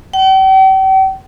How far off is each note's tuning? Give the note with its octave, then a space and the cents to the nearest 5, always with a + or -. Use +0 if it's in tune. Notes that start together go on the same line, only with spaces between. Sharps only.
G5 -40